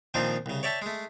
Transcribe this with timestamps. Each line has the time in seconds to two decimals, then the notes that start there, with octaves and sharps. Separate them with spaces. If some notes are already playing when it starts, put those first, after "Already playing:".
0.14 A#2 D#3 F3 C4 D4 D#4
0.46 C2 C#3
0.63 C#5 D5 E5 G5 A5
0.82 G#3 A3